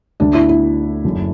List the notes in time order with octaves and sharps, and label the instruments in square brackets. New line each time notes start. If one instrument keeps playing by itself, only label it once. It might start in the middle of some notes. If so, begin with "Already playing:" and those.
[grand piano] D2 D3 A3 [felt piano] D4
[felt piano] E4
E4
[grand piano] F#1 F#2 D3 F#3